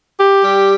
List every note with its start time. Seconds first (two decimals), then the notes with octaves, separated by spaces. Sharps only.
0.19 G4
0.43 G3